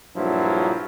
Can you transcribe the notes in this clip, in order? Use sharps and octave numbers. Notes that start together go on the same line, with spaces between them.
A#1 G2 F3 F#3 E4